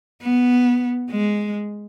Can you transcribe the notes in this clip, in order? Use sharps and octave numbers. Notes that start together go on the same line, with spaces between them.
B3
G#3